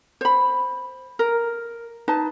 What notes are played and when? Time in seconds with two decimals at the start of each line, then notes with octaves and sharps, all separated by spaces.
0.21 C5 B5
1.19 A#4
2.08 D#4 B4 A5